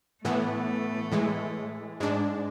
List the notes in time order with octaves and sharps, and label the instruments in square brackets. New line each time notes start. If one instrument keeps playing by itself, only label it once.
[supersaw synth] A2 E3 B3 [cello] A3
[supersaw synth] A2 E3 G#3
G#2 G#3 D4